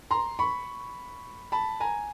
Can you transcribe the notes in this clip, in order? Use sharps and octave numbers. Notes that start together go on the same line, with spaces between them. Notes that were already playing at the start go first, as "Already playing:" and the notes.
A#5 C6
B5 C#6
A5 B5
G#5 A#5